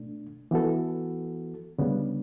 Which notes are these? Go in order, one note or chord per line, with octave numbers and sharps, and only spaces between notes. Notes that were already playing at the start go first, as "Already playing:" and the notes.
Already playing: B2 A3 D4
E3 B3 F#4 A4
D2 C#3 G3 B3 D4